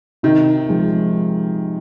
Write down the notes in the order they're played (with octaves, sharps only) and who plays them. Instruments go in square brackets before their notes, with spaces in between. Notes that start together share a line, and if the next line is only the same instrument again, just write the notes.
[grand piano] C3 [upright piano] D#3
[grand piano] F3 G#3